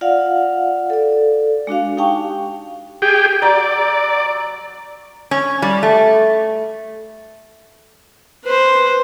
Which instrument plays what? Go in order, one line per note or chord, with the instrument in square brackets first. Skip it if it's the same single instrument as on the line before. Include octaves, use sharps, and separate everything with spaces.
[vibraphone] F4 D5 F5 F#5
A4 D5
G#3 D4 F#4 F5
D#4 G4 F5 G5 A5 C#6
[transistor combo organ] G4 G#4 G5
[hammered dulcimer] F#3 A#5 [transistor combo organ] D5
[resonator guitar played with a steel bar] C#4
G3
A3
[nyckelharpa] B4 C5